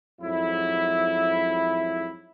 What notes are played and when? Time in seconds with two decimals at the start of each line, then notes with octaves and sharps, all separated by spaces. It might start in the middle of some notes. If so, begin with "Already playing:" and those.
0.21 F2 G#2 F#3 E4